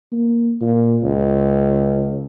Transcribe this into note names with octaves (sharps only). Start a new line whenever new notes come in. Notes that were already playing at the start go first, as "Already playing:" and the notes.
A#3
A#2
C#2